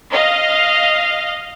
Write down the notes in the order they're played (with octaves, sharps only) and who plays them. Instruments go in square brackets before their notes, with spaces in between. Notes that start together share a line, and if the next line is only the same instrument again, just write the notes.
[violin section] D#5 F5